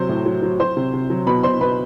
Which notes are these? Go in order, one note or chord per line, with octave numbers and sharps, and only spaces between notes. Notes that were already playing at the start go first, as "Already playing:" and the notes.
Already playing: C3 F#3 C5 C6
A2
F#3
F#3
F#3 C5 C6
C3
C3
F#3
B2 B4 B5
B2 C5 C6
B2 B4 B5